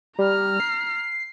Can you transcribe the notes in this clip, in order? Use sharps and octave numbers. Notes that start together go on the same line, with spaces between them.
G3 A#5 F6
C7